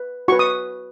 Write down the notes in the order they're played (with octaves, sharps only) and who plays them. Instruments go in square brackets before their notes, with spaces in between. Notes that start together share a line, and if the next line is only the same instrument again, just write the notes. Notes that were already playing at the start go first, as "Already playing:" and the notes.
Already playing: [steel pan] B4
F#4 C#6
B4
D#6